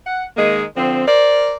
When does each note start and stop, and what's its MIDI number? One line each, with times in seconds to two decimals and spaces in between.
0.07 0.25 78
0.37 0.63 51
0.37 0.63 56
0.37 0.63 58
0.37 0.63 68
0.75 1.04 50
0.75 1.04 53
0.75 1.04 60
1.07 1.55 70
1.07 1.55 72
1.07 1.55 74